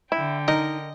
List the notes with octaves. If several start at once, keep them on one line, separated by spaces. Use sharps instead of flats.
D3 E4 G5
D#4 A#4 D#5